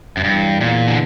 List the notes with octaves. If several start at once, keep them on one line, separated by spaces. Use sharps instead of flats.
F#2
E2 G2 B2 F#3 B3
A#2
D3